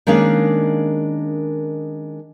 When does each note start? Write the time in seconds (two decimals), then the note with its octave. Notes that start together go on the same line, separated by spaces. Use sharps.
0.07 D#3 G#3 A#3 C#4 D4 F5